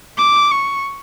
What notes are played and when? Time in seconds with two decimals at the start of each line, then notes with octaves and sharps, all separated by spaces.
0.18 D6
0.51 C#6